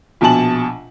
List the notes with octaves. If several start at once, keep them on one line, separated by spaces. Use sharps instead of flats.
A#1 B2 G#5 A5 F#7